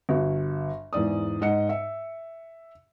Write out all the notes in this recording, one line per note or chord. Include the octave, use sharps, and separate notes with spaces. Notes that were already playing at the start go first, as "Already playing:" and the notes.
G1 F#4
E2 G#2 D5 D#6
G#2 D#5 F#5 C#7
E5